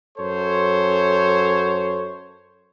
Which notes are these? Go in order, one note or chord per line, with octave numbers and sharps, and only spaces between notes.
F#2 A4 C5 C#5